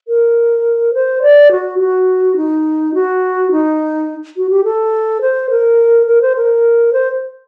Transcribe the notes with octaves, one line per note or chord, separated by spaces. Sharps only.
A#4
C5
D5
F#4
F#4
D#4
F#4
D#4
F#4
G4
A4
C5
A#4
A#4
C5
A#4
C5